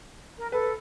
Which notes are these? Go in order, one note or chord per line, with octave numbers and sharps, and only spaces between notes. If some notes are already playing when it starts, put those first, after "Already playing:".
A#4
A4 B4